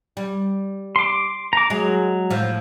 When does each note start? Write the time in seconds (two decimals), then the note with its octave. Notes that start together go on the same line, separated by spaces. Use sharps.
0.17 G3
0.96 C6 D6
1.53 A#5 D6
1.70 F#3 G#3
2.30 A2 F3